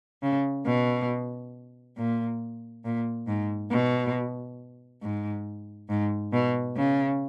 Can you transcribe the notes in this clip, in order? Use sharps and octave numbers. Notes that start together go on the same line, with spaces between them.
C#3
B2
A#2
A#2
G#2
B2
G#2
G#2
B2
C#3